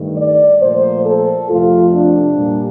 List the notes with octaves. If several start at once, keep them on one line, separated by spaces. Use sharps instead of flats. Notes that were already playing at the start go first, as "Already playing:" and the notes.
Already playing: G2 D#3 A3
D5
A#2 F3 A3 C5
A4
F2 C3 F3 A3 F4
D4
A#2 G3